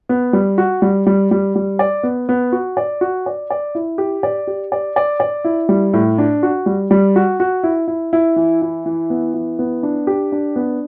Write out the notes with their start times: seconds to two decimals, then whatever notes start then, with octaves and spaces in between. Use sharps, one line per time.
0.09 B3
0.33 G3
0.58 F#4
0.82 G3
1.07 G3
1.31 G3
1.56 G3
1.79 D5
2.03 B3
2.29 B3
2.52 F#4
2.77 D5
3.01 F#4
3.26 D5
3.50 D5
3.75 E4
3.98 G4
4.23 D5
4.47 G4
4.72 D5
4.96 D5
5.20 D5
5.44 E4
5.69 G3
5.93 A2
6.18 D4
6.43 F#4
6.66 G3
6.91 G3
7.16 F#4
7.40 F#4
7.63 E4
7.88 E4
8.13 E4
8.36 E3
8.62 E4
8.86 E3
9.10 B3
9.34 E3
9.59 B3
9.83 D4
10.07 G4
10.32 D4
10.56 B3